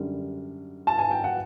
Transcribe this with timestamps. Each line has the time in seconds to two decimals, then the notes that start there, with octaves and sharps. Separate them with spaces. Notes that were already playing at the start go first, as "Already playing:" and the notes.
Already playing: F#2 D3 G3
0.87 A5
0.99 G#5
1.11 G5
1.24 F#5